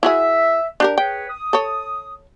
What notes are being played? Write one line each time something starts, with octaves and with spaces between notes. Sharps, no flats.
E4 F#4 G#4 E5
D4 G4 A#4
G#4 B4 C#5 G5
D#6
A4 C#5